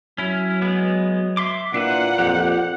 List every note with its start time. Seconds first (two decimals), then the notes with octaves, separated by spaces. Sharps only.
0.18 F#3 C#4 E4
0.62 G#3 B3
1.37 E5 C6 D6
1.74 A#2 D4 E4 B4 F#5
2.18 F2 G4